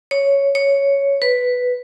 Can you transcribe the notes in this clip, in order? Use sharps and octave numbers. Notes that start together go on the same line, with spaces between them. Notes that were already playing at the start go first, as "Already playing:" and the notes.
C#5
C#5
B4